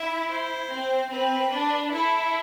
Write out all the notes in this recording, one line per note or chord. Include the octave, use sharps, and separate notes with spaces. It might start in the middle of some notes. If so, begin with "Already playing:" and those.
Already playing: E4 E5
C5
C4
C4 B4
D4
E4 A4